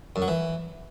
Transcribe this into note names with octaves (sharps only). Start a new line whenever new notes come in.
F#2
F#3
E3